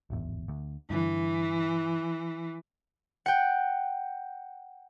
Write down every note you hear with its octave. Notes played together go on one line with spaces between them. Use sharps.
D1 G#1 E2
D2
G2 D3 E3
F#5 G5